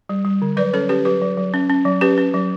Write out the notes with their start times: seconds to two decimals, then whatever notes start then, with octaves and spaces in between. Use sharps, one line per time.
0.09 G3
0.25 G3
0.42 D3
0.57 F#3 B4 D5
0.73 C#4 A4 C#5
0.89 C#4 G4 B4
1.05 F#3 G4 B4
1.22 F#3
1.37 F#3
1.54 C#4
1.69 C#4
1.85 F#3
2.01 C#4 G4 B4
2.18 C#4
2.34 F#3